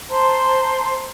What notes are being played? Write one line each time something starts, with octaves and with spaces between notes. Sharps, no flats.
C5 A5 A#5 C6